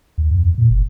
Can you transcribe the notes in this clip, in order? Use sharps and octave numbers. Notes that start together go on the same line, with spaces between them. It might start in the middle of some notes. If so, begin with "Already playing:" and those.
D#2
F2
E2
A#2
F#1